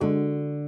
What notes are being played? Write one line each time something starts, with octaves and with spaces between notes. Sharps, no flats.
D3 G#3 D4 F#4